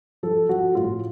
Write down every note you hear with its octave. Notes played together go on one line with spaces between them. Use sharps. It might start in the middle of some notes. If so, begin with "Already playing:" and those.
F3 A4
F3 F#4
A2 F4